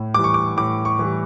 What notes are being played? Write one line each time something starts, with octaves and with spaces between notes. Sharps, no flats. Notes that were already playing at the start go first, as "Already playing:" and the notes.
Already playing: A2
E3 G3 D6
C#6
D6
A2 D6
C#6
E3 G3